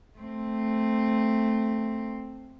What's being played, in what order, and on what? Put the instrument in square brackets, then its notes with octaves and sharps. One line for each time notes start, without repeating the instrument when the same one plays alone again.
[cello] A3 C4